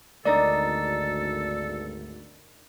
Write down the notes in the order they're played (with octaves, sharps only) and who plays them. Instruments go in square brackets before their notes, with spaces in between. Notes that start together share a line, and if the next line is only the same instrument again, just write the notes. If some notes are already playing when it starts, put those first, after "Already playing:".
[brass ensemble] G#1 D2 [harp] D4 D#4 A#4 [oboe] A4 [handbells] D5